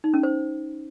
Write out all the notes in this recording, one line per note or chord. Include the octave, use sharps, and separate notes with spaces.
D#4
C#4
C5